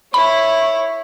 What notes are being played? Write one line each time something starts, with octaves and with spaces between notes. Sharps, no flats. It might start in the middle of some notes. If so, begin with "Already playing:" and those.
E4 C#5 B5